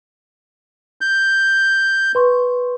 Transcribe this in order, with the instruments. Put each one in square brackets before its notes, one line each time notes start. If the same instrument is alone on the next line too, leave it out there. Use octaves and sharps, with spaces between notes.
[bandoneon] G6
[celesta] B4 C6 C#6